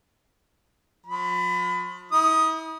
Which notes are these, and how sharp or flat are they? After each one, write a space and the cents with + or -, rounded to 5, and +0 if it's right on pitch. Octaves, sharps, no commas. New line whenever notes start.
F3 +40 B5 +25
E4 -45 D#6 +0